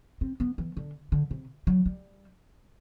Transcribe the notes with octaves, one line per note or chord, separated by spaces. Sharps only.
C4
B3
E3
D3
D3
C3
F#3
G3